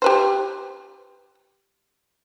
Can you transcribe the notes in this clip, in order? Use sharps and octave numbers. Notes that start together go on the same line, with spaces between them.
G4 B4 C5